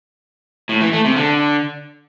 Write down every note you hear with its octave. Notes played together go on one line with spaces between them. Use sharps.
A2
E3
A3
C3
D3